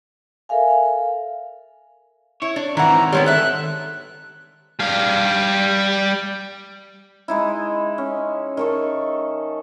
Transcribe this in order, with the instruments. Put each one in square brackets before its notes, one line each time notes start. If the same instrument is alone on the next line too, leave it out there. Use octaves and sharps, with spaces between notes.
[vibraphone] A4 A#4 E5 F5 G#5
[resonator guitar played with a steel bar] E4 [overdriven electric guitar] C#5
[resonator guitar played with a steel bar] D4
[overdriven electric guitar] D#3 C4 [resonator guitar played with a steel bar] E3 F#5 [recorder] A#5
[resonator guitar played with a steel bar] G3 G#3 B3 [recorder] C#5
[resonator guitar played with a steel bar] A4 E5 [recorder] F#6
[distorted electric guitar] G3 F5
[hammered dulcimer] G#3 D#4 E4
C#4
D#3 A4 C#6